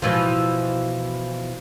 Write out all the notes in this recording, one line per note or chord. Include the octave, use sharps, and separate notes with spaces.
B2 E3 F3